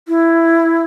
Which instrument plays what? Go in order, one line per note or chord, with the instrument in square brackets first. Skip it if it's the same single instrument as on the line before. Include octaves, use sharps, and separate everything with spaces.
[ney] E4